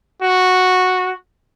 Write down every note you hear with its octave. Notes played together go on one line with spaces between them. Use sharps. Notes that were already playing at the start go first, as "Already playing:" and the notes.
F#4